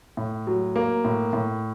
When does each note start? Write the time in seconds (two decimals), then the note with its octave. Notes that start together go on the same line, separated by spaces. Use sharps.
0.17 A2
0.47 F#3
0.76 A#3
1.05 A2
1.33 A2